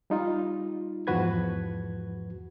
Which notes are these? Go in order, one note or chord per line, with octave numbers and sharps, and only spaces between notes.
G3 D#4 F4
E2 G#2 F3 F#4 B4 G#6